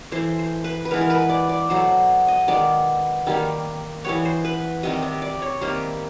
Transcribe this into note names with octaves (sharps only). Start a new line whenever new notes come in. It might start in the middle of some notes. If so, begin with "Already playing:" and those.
E3 A3 C5
C5
B4
B4
E3 G#3 B3 A#4
A#4
B4
D5
D5
B2 F#3 A3 C5
D#5
D#3 G#3 B3 D5
D#3 G3 A#3
E3 G3 B3 C#5
C5
B4
C3 D#3 G3 D#5
D#5
D5
C#5
C3 D#3 G3 A#3 C5